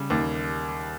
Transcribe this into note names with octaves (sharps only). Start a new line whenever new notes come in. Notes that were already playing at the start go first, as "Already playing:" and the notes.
Already playing: C#3 G3
D#2